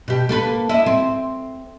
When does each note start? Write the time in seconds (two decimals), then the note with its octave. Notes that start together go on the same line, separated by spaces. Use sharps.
0.08 B2 G4
0.29 A#3 A4 B4
0.69 E4 D#5
0.86 C4